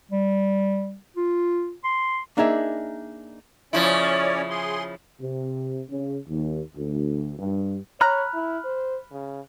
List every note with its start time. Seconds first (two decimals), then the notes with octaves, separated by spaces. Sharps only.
0.11 G3
1.17 F4
1.84 C6
2.37 A#3 D4 D#4 G#4 E5
3.73 C#3 F3 C#4 E4 C#5 D5
4.50 G#4 C6
5.20 C3
5.89 C#3
6.27 D#2
6.74 D2
7.39 G2
8.01 C#5 A#5 B5 F6 F#6
8.34 E4
8.64 C5
9.12 C#3